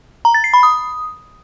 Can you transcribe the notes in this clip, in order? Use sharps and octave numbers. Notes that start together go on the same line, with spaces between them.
A#5
A6
C7
B5
D#6